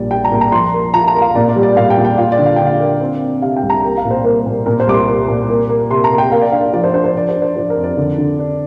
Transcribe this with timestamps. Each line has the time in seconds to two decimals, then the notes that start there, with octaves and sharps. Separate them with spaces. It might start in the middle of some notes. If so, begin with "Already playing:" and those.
Already playing: A#1 A#2 G3 D5
0.11 G3 G5
0.24 A#5
0.32 A#2
0.41 A#5
0.52 F3 C6
0.73 A#3
0.94 F4 A#5
1.08 A#5
1.15 A#3
1.21 F5
1.35 A#2 D5
1.49 D5
1.56 G3
1.63 D5
1.76 A#2 F5
1.90 G5
1.97 A#2
2.05 G5
2.18 F4 F5
2.32 D5
2.39 D3
2.46 F5
2.56 D3 G5
2.66 F5
2.80 A#3
3.01 C4
3.21 C4
3.42 C3 F5
3.56 G5
3.63 C2
3.70 A#5
3.84 A#3 G5
3.97 F5
4.05 A#2
4.11 C5
4.25 A#3 C5
4.46 A#2
4.66 A#2 A#4
4.80 C5
4.87 C2 D6
4.94 C6
5.07 A#3
5.28 A#2
5.49 A#3
5.69 A#3
5.91 C3 C6
6.04 A#5
6.12 A#3
6.18 G5
6.32 A#3 F5
6.42 D5
6.52 D4 F5
6.73 F3 D5
6.84 C5
6.90 D5
6.94 D4 C5
7.04 C5
7.15 F3 D5
7.29 C5
7.36 D4
7.42 C5
7.56 F3 C5
7.70 A#4
7.76 F2
7.84 D5
7.97 D3
8.18 D3
8.39 D4